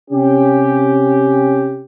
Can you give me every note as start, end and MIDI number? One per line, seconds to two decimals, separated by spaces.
0.11 1.84 48
0.11 1.84 61
0.11 1.84 67